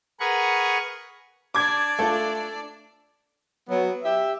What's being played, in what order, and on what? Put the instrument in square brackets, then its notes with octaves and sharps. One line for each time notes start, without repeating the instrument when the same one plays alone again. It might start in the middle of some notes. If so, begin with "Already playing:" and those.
[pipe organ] G#4 A#4 B4 F#5 C#6
[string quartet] D4 D5 [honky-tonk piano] D6 G#6
[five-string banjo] A3 F4 [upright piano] A4
[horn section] F#3 B3
G4 E5